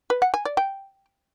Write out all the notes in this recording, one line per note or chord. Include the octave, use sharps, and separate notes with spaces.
B4
F#5
G#5
D5
G5